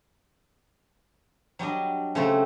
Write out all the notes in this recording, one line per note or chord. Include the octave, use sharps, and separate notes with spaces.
F#3 G3 D4 D#5
C#3 F#3 A3 C4 A4